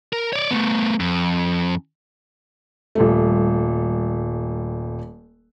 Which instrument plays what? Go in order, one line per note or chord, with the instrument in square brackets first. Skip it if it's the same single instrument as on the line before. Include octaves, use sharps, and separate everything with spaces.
[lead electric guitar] A#4
C#5 D5
A3 B3
F2
[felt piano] D#1 G3 A3